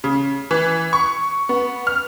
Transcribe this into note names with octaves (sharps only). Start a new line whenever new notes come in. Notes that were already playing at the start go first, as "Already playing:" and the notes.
C#3
E3
C#6
B3
F6